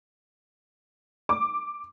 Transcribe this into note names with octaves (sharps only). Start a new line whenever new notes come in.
D6